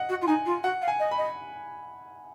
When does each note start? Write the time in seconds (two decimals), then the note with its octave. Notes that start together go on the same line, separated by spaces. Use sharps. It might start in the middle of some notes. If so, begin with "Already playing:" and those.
Already playing: D#5 F#5
0.09 F#4
0.21 F4
0.27 D#4 G#5
0.46 F4
0.63 F#4 F#5
0.82 F5
0.88 G#5
0.99 D#5
1.11 B5
1.18 D#5